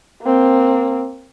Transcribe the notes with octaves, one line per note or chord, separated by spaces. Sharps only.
A#3 C4